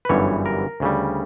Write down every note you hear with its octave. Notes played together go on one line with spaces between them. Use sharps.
B4
G1 F#2 E3 G3 C#5
A#4
D2 C#3 G3